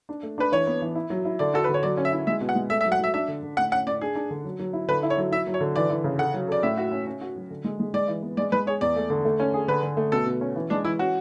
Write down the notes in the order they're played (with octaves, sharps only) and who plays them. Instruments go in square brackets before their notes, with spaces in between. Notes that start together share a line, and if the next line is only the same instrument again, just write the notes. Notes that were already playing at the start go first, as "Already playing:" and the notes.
[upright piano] D4
A3
[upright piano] D4 [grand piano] B4
[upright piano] E3 [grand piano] C#5
[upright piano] B3
E3
E4
F#3
E4
[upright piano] D3 [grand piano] D5
[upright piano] F#4 [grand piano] A4
[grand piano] B4
[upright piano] D3
[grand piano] C#5
[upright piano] F#3 [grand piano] D5
[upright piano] C#4
[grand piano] E5
[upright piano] E4
[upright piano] G#3 [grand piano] E5
[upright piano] B2
[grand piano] F#5
[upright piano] G#3
[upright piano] A3 [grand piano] E5
[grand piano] E5
[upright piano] F#3
[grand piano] F#5
[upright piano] F#3 [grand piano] E5
[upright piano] D4 [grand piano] E5
[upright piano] D3
D3
[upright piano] A2 [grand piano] F#5
[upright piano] C#4 [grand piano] F#5
[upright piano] A2 [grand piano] D5
[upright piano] D4 [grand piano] G#4
[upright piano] D4
D3
F#3
F#3
E4
[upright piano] D3 [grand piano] B4
[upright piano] E4
[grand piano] C#5
[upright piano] F#3
[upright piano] E4 [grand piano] E5
[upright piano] F#3
[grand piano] C#5
[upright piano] D3
[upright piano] E3 [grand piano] D5
[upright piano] E3
C#3
[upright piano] A4 [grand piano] F#5
[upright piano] F#3
[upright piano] A4 [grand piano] D5
[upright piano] A2 [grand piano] E5
[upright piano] F#4
C#4
C#4
F#4
F#3
D3
G#3
G#3
[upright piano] G#3 [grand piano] D5
[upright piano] E3
B3
[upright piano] G#3 [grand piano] D5
[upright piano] G#3 [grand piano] B4
[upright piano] G#4 [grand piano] C#5
[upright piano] E2 [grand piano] D5
[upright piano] A3
D3
A3
C#4
G#4
[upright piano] D3 [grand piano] B4
[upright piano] D3
A3
[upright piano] B2 [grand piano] A4
[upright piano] B2
C#4
E3
[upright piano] G#3 [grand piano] D4
[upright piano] E3 [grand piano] E4
[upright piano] C#4 [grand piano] F#4